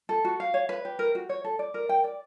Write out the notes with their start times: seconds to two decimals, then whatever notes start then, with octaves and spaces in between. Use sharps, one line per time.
0.09 A4
0.25 F#4
0.40 F5
0.54 C#5
0.69 B4
0.85 G4
0.99 A#4
1.15 F#4
1.29 C#5
1.44 A4
1.59 D5
1.74 A#4
1.89 G5
2.04 D5